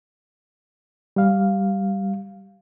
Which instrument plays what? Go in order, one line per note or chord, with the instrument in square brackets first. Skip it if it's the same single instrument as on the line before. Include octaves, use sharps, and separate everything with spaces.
[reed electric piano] G3 F5